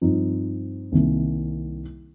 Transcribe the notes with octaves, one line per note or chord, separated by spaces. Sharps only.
G2 F3 C4 D#4
C2 C3 D#3 A#3